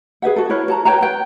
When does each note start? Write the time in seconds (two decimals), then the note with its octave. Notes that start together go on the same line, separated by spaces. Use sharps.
0.22 G#4 B4 E5 F#5
0.36 F#4 A4
0.49 E4 A#4 B4 C#5
0.68 F#4 A5 A#5
0.85 B4 C#5 G5 A#5
1.01 B4 G5